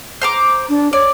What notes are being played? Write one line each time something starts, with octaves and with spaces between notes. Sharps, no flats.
C5 A#5 D6
D4
C#5 D5